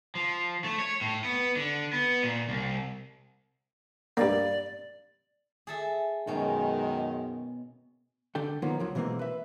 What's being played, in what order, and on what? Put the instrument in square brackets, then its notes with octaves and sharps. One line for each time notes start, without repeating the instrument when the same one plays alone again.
[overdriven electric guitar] F3
A3
C#5
A2
B3
D3
B3
A#2
C2
[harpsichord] G2 A#3 [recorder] D5
[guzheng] G#4 A4 E5
[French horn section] F#2 D#3 G#3 [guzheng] B2 C#4
[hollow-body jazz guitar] D3 D4 A4 G5
D#3 F3 F#3 A#3 B3 D#4
C#2 F3 F#3
B2 D3 E3 G#3 A#3 C4
B4 E5